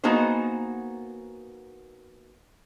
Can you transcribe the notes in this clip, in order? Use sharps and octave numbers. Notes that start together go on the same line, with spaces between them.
A#3 B3 D#4 F#4 G#4 C5